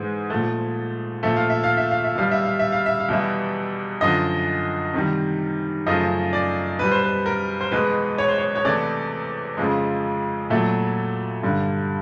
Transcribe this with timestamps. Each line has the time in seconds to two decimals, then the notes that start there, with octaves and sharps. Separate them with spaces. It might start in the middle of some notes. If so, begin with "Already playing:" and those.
Already playing: G#2 E3 G#3
0.30 A#2 F3 A3
1.23 A#2 F3 A3 E5
1.36 F5
1.50 E5
1.64 F5
1.77 E5
1.91 F5
2.04 E5
2.15 B2 G3 F5
2.32 E5
2.45 F5
2.59 E5
2.72 F5
2.86 E5
3.00 F5
3.09 E2 B2 G3 E5
4.01 F#2 D3 F3 D#5
4.94 C3 D#3 G3
5.86 F#2 C#3 F3 A3 D#5
6.33 D5
6.79 B2 G3 B4
6.91 C5
7.03 B4
7.26 A#4
7.61 C5
7.72 E2 B2 G#3 B4
8.18 C#5
8.28 C5
8.38 C#5
8.56 C#5
8.65 E2 C3 E3 A3 D5
9.57 F2 C#3 F3 G#3
10.50 A#2 F#3 A3 E5
11.43 G2 D3 G3